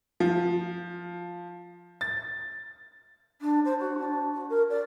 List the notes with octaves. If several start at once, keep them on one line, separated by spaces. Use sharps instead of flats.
F3
A6
D4
C5
F#4
D4
F#4
A#4
D5